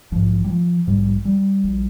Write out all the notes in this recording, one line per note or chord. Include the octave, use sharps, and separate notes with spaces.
A#1 G#2 F3
G3
F3
A#1 G#2 G3
G3
A#1